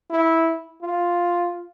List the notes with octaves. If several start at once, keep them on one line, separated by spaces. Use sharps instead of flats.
E4
F4